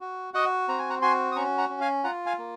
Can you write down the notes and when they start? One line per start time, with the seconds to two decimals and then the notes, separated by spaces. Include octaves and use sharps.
0.01 F#4
0.34 F#4 D#5 F#5
0.68 C4 A#5
0.79 G#5
0.90 F#5 A#5
1.02 F#4 G#5 C6
1.32 D#6
1.36 C#4 A#5 C#6
1.58 F#5 A#5
1.69 C#4
1.81 F5 G#5
2.04 F4 F#5 A#5
2.26 F5 G#5
2.38 A#3